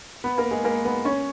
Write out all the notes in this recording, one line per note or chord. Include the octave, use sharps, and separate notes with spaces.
B3 B4
A#3 A#4
G#3 G#4
A#3 A#4
B3 B4
C#4 C#5